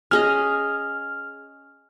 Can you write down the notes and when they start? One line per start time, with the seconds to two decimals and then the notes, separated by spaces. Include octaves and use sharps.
0.11 C#4 G#4 D#5 F6